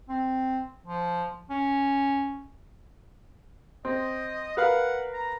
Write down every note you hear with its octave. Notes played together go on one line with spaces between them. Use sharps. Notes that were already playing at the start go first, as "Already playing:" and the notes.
C4
F3
C#4
C4 D#5
A#4 B4 F5 F#5
A#5